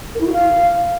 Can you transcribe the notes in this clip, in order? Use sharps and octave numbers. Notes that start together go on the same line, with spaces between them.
A#4
E4
F#4
F5